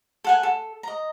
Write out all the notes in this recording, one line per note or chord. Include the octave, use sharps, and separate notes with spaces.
A4 F#5 G#5
A4
D#5 A#5